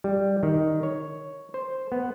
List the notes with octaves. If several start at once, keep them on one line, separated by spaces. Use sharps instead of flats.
G3
D#3
C#5
C5
B3